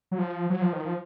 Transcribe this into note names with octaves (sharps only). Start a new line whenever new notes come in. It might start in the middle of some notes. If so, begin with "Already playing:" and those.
F#3
F3
F#3
F3
D#3
F3